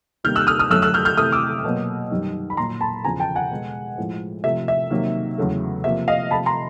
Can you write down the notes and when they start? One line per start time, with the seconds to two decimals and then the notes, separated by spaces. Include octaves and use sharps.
0.24 C3 D#3 G3 A#3 F6 G6
0.35 E6 F#6
0.47 D#6 F6
0.59 D#6 F6
0.70 F#2 D3 F#3 A3 E6 F#6
0.82 E6 F#6
0.94 F6 G6
1.05 F6 G6
1.17 C3 E3 A3 D#6 F6
1.32 D6 E6
1.64 B2 F#3 A#3
2.11 F#2 D#3 G3
2.50 B5
2.57 A#2 F#3 A#3 A#5 C6
2.81 A5 B5
3.04 E2 C#3 F3 G#5 A#5
3.20 G5 A5
3.35 F#5 G#5
3.50 B2 G#3
3.98 A2 F3 G#3
4.44 C3 F3 A3 E5
4.68 E5
4.90 C3 D#3 F#3 A#3
5.38 E2 C#3 F#3 A3
5.84 C3 F3 A#3 E5
6.08 D#5 F5
6.31 C3 F3 A3 A5 B5
6.46 A#5 C6